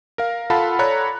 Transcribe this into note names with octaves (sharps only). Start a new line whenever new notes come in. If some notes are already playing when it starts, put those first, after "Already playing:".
A#4 F5
F4 A4 F5 F#5 A5 B5
A4 C#5 D5 A#5 B5 F#6